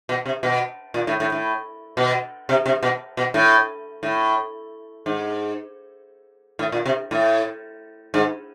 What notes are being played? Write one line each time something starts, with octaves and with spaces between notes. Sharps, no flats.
B2
C3
B2
A#2
A2
A2
A2
B2
C3
C3
B2
B2
A2
A2
G#2
A2
A#2
C3
A2
G#2